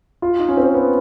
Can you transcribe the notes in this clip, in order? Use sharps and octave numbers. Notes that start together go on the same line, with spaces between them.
F4
D#4
C#4
C4
B3